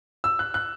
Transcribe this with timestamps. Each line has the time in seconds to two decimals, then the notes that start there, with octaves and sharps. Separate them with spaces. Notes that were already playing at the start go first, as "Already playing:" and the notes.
0.24 E6
0.39 F#6
0.54 F#6